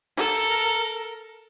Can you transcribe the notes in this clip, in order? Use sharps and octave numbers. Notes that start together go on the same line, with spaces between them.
A4 A#4